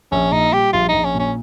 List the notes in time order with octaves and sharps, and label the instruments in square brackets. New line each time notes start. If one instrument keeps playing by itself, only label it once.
[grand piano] A#1 [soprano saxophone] C#4
[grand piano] A#2 [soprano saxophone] D#4
[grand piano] G3 [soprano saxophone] G4
[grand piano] A#1 [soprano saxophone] F4
[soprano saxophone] D#4
[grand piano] A#1
[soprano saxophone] C#4
[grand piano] A#2 [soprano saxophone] C#4